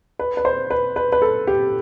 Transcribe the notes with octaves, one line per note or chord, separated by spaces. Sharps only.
B4
B4
C5
B4
B4
B4
A4
G4